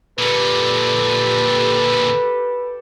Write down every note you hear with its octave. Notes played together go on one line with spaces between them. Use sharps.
A#2 D3 G4 A4 B4